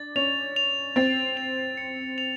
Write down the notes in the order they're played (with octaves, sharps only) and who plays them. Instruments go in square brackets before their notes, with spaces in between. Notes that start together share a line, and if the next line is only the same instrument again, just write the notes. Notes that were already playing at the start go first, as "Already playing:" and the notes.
Already playing: [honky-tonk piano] D4 [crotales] A6
[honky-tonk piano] C#4 [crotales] F7
[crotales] F7
[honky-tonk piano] C4 [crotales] A6
[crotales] F7
C#7
F7